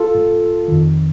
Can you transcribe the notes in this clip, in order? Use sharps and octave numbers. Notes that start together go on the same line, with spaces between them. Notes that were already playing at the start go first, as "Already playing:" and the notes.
Already playing: F4 A4
A2
F2 D#3